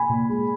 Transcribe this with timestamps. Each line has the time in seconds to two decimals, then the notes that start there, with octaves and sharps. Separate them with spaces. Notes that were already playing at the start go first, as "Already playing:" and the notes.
Already playing: G#5 B5
0.09 A#2
0.29 G#3